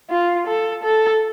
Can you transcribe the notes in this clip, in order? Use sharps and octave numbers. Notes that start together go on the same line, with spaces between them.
F4
A4
A4